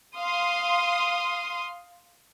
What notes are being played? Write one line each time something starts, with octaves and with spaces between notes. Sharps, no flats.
F5 C6 D#6